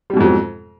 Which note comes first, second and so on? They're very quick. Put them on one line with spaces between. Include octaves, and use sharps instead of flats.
G3 B2 G#2 F2 F#3